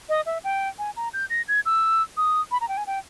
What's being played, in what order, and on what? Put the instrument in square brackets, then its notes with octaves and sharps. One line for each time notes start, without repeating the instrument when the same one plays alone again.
[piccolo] D#5
E5
G5
G#5
A#5
G6
A#6
G#6
E6
D#6
B5
A#5
G5
G#5
G5